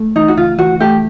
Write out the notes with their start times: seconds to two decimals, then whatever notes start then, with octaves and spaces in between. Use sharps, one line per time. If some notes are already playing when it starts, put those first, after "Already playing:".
Already playing: A3
0.16 E3 D#4
0.28 F#4
0.37 C#2 F4
0.59 E3 F#4
0.80 A3 G4